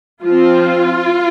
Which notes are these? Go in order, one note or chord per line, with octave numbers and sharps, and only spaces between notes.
F3 C4 F4